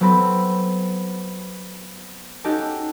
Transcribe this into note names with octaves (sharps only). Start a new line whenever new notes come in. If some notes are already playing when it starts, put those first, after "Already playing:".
F#3 B3 C4 A4 B5
C#4 D#4 F#4 G4 A4 A5